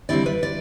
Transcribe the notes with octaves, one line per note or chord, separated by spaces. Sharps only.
D3 G3 C4 E4 D5
B4
D5